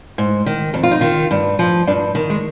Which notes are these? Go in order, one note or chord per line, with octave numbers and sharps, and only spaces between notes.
G#2
D#3
F2
F4
D#4
D#3 F4
G2
F3
G2 D4
D#3
G#3